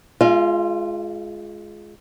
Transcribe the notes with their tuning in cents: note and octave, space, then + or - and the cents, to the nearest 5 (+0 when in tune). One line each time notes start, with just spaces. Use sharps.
G#3 +15 F4 +0 F5 -45